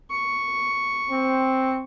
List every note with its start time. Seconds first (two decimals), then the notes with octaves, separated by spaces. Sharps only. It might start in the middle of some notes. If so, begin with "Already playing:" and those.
0.11 C#6
1.10 C4